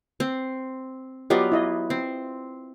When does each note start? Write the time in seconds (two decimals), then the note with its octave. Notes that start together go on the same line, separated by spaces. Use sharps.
0.20 C4
1.30 F#3 B3 F4 G4 D5 D#5
1.52 E4 D#5
1.90 C4